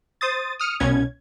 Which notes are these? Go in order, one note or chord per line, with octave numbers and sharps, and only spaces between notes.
C5 D#6 A6
D#6 F6 C#7
C2 B2 C#4 G#6